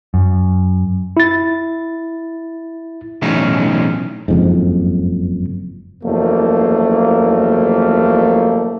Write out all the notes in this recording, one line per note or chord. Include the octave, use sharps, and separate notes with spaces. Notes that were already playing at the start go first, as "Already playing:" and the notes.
F#2
E4 A6
B1 E2 A2 C#4 D#4
F#1 F2 G#2
F#1 E2 F3 A3 A#3